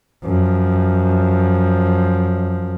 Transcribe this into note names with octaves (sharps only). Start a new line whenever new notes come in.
F#2 F3